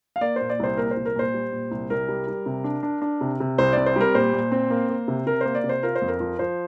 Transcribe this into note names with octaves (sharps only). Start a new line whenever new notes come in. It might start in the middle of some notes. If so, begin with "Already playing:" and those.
F5
A#3 D5
A#2 C5
D5
C2 C5
A#2 A#4
C5
C2
A#4
A#2 C5
G3
A#2
C2
C2 A#4
G3
G3
C3
D4
D4
D4
C3
C3
C2 C5
C4 D5
C5
G3 A#4
A#2 C5
A#2
C4
A#3
A#3
C3
C3 A#4
A#3 C5
D5
C3
C5
F4 A#4
C5
F2
A#4
F3
F3 C5